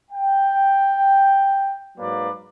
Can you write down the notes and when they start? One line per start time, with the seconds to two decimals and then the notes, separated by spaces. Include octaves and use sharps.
0.11 G5
1.98 G#2 F#3 A#3 B4 D5